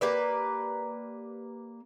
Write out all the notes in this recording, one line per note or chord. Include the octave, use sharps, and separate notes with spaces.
A#3 G4 B4 D5